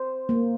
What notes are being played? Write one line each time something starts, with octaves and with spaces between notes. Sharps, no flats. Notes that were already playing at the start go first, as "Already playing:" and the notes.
Already playing: C5
A#3